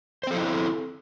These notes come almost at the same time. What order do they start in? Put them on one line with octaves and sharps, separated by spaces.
C5 C4 A4 E4